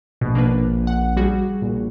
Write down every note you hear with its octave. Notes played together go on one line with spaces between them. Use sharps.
A#1 B2
A#3 D4 B4
F#5
G3 F#4 G#4
A#1